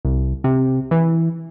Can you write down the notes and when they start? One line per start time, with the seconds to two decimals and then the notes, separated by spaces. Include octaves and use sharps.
0.05 C2
0.44 C3
0.91 E3